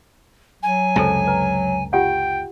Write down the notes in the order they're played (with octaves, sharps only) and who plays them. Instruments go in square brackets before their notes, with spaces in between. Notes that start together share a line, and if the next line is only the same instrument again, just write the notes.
[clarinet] F#3 [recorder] G#5
[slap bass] C#2 F#2 C3 [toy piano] A4 C5 A5
[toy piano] B4 A#5
[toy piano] F4 G4 F#5 [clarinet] G5